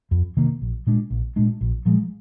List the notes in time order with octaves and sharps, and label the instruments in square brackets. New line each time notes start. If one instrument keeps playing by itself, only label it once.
[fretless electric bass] F2
C3 D#3 A#3
A#1
A#2 G#3 D4
A#1
A#2 G#3 D4
A#1
A#2 F3 G#3